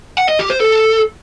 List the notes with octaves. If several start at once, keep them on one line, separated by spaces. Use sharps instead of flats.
F#5
D#5
G4
C5
A4